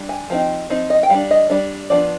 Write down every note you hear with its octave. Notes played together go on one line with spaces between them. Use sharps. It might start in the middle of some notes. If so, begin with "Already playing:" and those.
Already playing: G3 D4
G#5
F3 C4 D#4
F3 C4 D#4
D#5
G5
G3 D4 F5
D#5
G3 D4 D5
F3 B3 D4 D5